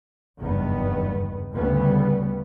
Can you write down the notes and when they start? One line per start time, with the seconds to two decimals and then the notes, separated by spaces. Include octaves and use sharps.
0.39 F#1 E2 G2 D#3 B3
1.54 D2 A2 C#3 G3 B3 C#4